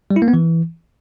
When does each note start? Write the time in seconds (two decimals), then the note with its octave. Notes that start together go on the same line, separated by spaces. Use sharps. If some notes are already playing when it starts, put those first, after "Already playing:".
0.11 G3
0.16 E4
0.22 A#3
0.28 B3
0.34 E3